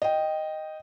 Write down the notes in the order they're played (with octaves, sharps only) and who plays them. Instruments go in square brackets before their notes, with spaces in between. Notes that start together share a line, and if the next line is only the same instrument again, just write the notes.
[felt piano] D#5 G5